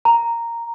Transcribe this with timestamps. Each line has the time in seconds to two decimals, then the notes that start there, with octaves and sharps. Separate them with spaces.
0.05 A#5